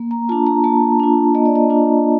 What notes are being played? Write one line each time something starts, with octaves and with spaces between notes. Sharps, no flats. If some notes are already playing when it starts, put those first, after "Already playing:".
Already playing: A#3
A#5
D4 F4 A5
A#5
A#3 A5
D4 F4
A#3 D#5
D5
D#5
D4 F4